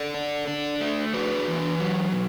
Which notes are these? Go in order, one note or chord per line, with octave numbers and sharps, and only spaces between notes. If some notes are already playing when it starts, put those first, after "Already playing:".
Already playing: A4 D5
D4
D4
A3
D4 F#4 B4
E3
F#3
B2